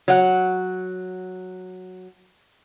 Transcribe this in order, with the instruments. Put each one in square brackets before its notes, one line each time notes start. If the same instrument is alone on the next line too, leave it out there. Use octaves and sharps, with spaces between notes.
[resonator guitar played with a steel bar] F#3 F#5